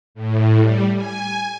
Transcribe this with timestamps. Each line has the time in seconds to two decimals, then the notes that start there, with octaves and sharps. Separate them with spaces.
0.15 A2
0.60 G3
0.96 G#5